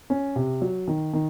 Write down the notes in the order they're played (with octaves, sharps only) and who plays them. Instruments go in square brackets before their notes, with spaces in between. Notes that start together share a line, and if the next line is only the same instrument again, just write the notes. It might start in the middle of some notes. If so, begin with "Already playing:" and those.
[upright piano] C#4
C3
F#3
D#3
D#3